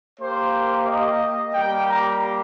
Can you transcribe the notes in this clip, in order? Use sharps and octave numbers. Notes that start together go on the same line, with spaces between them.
A#3 G4 C5
D#5
G3 A#3 G4 G5
A#5